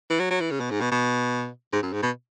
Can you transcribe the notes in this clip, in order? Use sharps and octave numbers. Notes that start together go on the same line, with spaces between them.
E3
F#3
F#3
E3
C#3
B2
G#2
B2
B2
G#2
F#2
G#2
B2